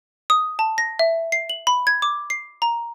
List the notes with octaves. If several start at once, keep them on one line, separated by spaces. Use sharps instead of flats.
D#6
A5
A#6
E5
C7
F#7
B5
G#6
D6
C7
A#5